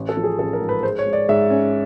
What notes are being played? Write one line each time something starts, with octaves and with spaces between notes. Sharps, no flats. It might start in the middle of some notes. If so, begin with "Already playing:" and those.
Already playing: A1
A4
F3
G#4
A1 A4
A#4
G#2
B4
G#3 C5
C#5
G#3
D5
G#2 E5
C#4